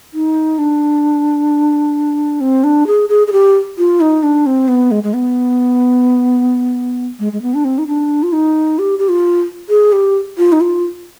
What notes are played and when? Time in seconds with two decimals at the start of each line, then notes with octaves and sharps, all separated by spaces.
0.14 D#4
0.58 D4
2.41 C4
2.64 D4
2.87 G#4
3.09 G#4
3.27 G#4
3.32 G4
3.78 F4
4.01 D#4
4.23 D4
4.46 C4
4.68 B3
4.91 G#3
5.04 G#3
5.14 B3
7.19 G#3
7.33 G#3
7.42 B3
7.54 D4
7.65 C4
7.78 D#4
7.87 D4
8.23 F4
8.33 D#4
8.79 G4
8.99 G4
9.09 F4
9.69 G#4
9.92 G4
10.38 F4
10.52 D#4
10.61 F4